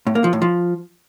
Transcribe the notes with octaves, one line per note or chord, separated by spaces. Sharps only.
A2
A#3
F3
A2
F3